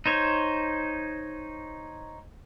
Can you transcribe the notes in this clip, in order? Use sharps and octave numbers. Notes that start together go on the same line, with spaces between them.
D#4 C5 C#5